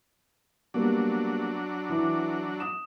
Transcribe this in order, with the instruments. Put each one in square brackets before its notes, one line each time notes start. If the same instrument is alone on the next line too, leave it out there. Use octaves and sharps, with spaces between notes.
[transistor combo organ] F#3 D4 [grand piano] G3 A#3 B3
[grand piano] E3 D6
D#6 E7